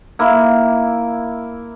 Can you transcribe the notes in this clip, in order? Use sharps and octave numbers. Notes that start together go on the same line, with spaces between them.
A#3 E4